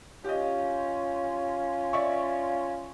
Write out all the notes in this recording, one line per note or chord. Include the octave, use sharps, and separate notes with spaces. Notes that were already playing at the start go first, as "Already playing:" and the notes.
C#4 F4 G4 D#5
D5 E5 C#6